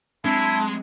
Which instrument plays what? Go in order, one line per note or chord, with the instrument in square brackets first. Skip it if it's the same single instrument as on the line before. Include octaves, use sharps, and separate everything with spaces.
[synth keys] F#3 C4 D4 [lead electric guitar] G#3 [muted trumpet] E4 [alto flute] A5